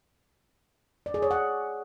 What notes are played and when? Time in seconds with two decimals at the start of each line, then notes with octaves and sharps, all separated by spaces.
1.06 D5
1.14 G#4
1.22 C#5
1.31 F#5